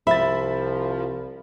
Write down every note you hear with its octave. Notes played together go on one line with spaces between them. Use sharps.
C2 F3 E5 B5 A6